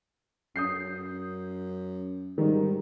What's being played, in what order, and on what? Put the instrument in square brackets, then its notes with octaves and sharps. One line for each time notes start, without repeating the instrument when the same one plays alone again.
[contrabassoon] F#2 [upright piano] D#6 G6 C7
[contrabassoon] G#2 [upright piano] D#3 G3